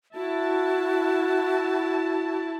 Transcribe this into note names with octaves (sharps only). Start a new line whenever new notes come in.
E4 F#4 A5